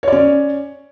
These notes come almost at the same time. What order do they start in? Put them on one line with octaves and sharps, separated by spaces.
C#5 D5 C#4